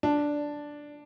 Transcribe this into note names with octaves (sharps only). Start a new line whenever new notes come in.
D4